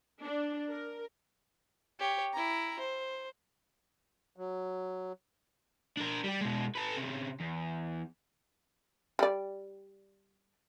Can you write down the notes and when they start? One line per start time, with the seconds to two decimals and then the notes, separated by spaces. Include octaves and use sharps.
0.23 D4
0.72 A#4
1.99 G4 C#5
2.33 E4 A#5
2.79 C5
4.36 F#3
5.97 D4 A#4
6.24 G3 G4
6.41 B2 G#3
6.75 A4 B4
6.97 C3 C#4
7.40 E2
9.19 G3 D5